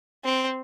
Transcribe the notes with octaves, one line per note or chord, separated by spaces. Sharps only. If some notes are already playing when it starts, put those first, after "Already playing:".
C4